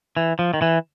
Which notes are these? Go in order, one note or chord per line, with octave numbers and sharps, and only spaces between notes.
E3
F3
D#3
E3